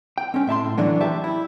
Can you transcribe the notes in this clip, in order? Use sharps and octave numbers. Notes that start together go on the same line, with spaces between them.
G5
C4 C#4
A2 E5 A5 C6
D3 E3 F#3 B3 D4
G4 E5 A5
E4